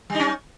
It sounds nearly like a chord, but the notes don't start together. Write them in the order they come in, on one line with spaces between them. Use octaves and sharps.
G3 D#4 C#4